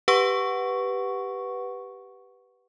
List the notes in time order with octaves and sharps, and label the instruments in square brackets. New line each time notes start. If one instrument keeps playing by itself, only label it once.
[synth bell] G4 B4 F#5 C#6